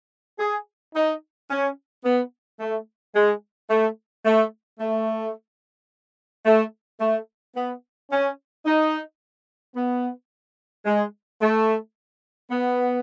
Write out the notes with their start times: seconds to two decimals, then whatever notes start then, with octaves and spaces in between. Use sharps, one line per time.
0.39 G#4
0.95 D#4
1.50 C#4
2.04 B3
2.60 A3
3.15 G#3
3.70 A3
4.25 A3
4.80 A3
6.45 A3
7.00 A3
7.56 B3
8.11 C#4
8.66 D#4
9.75 B3
10.85 G#3
11.41 A3
12.51 B3